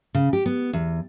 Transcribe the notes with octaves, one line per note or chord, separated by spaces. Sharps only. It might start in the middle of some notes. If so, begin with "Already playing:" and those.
C#3
G4
B3
E2